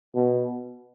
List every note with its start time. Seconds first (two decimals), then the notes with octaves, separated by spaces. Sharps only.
0.15 B2